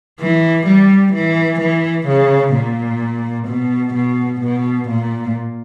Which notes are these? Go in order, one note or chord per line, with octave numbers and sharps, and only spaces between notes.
E3
G3
E3
E3
C#3
A#2
B2
B2
B2
A#2